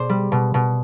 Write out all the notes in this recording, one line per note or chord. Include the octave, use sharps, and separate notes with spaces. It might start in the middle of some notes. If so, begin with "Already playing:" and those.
Already playing: B2 C5 D5
G3
B2
B2